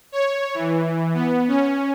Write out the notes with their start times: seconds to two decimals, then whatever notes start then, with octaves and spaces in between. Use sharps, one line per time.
0.12 C#5
0.54 E3
1.14 B3
1.48 C#4